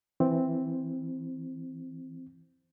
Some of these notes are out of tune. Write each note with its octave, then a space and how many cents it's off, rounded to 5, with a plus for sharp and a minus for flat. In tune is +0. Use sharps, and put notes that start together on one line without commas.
E3 +0 C4 +0